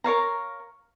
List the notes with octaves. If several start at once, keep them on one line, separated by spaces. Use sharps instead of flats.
A#4 C#5 F5 A#5